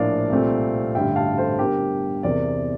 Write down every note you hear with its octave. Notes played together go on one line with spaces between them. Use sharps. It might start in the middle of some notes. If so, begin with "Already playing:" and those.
Already playing: A#1 A2 F3 A#3 D4 D5 F5
C2 A#2 A3 C4
A1 G2 D3 E5 G5
F5 A5
A4 C5
G1 G2 D3 G4 A#4
E2 C3 E3 A#4 D5